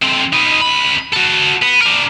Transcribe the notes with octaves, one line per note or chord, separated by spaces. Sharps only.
D3 C4
D#4 B4
C#2 B5
F#4 A4
B3
D4 A#4